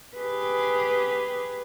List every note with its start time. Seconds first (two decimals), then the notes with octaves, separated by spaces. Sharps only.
0.17 G4 G#4 B4